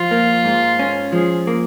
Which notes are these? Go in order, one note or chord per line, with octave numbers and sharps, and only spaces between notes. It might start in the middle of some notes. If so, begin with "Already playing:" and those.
Already playing: F3 F4
A#3
G#2
C#4
F3 G#4
A#3